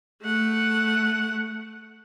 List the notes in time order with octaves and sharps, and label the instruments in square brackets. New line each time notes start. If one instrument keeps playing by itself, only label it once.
[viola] A3 F#5